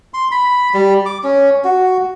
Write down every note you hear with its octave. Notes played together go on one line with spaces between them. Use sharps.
C6
B5
G3
D6
C#4
F#4